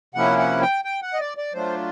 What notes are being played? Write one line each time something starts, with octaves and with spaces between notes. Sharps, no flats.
C3 F3 A#3 C#4 E4 F#5
F#5
G5
G5
F#5
D#5
D5
D5
F#3 A3 D4 F4 C5